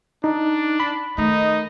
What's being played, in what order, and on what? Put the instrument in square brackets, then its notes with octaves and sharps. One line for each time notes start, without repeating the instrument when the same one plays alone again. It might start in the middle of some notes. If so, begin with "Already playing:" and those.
[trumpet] D4 [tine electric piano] D#4
[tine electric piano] B5
[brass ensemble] D#3 D#5 [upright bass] A3 [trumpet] D#4